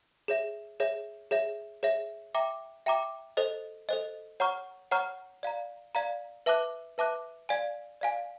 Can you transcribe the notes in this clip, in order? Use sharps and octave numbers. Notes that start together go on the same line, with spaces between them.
G#4 C#5 E5
G#4 C#5 E5
G#4 C#5 E5
G#4 C#5 E5
E5 G5 A#5 D6
E5 G5 A#5 D6
A4 C5 D#5
A4 C5 D#5
C#5 F#5 A#5 C#6 F6
C#5 F#5 A#5 C#6 F6
D5 F5 A#5
D5 F5 A#5
B4 E5 A5 D6 F#6
B4 E5 A5 D6 F#6
D5 F5 G#5
D5 F5 G#5